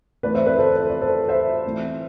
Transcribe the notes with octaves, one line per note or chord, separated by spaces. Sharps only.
E3 A3 C4 B4 D5
C5 E5
B4 D5
A4 C5
C5
D5
A4 C5
C5 E5
E3 A3 C4